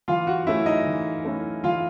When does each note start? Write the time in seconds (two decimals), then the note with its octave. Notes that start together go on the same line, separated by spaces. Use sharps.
0.08 E3 F4 F5
0.27 F#4 F#5
0.47 A3 C#4 E4 E5
0.66 D#4 D#5
0.86 E3
1.25 A3 C#4 E4
1.64 E3 F4 F5